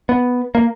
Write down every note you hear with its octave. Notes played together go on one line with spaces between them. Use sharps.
B3
A#3